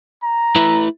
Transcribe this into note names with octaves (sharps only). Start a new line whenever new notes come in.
A#5
A3 E4 B4